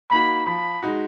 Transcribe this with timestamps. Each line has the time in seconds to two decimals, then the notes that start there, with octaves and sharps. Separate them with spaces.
0.11 A#3 D#4 F#4 B5
0.47 F3 B5
0.82 G#3 D#4 F#4